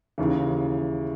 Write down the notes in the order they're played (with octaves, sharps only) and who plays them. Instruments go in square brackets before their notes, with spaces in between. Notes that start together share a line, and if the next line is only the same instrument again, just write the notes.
[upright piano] D#2 C#3 E3